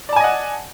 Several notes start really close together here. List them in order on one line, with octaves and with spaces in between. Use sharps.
D5 A5 G#5 D#5 F#5